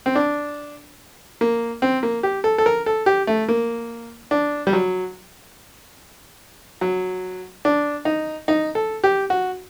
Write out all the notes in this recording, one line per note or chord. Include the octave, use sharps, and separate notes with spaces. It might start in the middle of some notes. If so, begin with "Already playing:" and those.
C4
D4
A#3
C4
A#3
G4
A4
A4
A#4
A4
G4
A3
A#3
D4
G3
F#3
F#3
D4
D#4
D#4
A4
G4
F#4